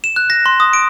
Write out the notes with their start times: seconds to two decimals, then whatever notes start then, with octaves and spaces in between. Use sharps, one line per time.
0.04 E7
0.16 F#6
0.30 A#6
0.46 C6
0.60 D#6
0.73 D7